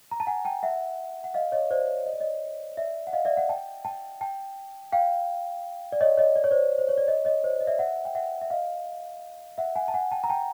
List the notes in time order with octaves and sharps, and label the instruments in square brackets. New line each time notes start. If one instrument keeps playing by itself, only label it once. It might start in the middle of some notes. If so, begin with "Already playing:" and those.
[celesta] A#5
A5
F#5 G#5
G5 A5
E5 F#5
F#5
D#5 F5
C#5 D#5
C5 D5
D#5
D5
C#5 D#5
D5 E5
F#5
D#5 F5
D5 E5
E5 F#5
G5 A5
G5 A5
G5 A5
F5 G5
D5
C#5 D#5
C#5 D#5
D5
C#5
C5 D5
C5
C#5
D5
C#5 D#5
C#5 D#5
C5 D5
D#5
D5 E5
E5 F#5
G5
E5 F#5
E5
D#5 F5
E5 F#5
F#5 G#5
A5
F#5 G#5
G5 A5
A#5
G5 A5